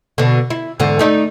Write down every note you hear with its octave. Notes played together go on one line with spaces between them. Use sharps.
B2 D3
E4
E2 G#2 D3
A3 D#4 D5